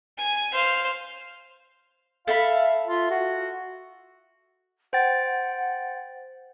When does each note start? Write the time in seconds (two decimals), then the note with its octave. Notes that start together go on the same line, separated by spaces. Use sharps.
0.18 G#5
0.52 C5 F5
2.27 A4 E5 F5 B5
2.87 F4
3.10 F#4
4.93 C5 F#5 G5 A6